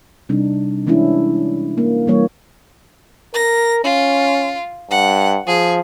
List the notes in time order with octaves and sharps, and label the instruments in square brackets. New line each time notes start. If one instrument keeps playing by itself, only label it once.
[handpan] C3 G3 D4 D#4
E3 G#3 C#4 D4 E4
A#3
E3 G3 A#3 C#5
[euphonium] A#4 [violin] A#6
[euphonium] C#4 [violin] F4
[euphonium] G2 [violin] F#5
[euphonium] F3 [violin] G#4